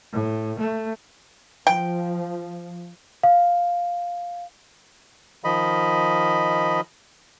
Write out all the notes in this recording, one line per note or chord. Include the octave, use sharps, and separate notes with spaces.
A2
A3
F3 G5
F5
D#3 F3 D#5 B5